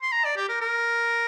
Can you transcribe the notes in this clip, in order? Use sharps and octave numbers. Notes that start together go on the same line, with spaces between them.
C6
A#5
D5
G4
A#4
A#4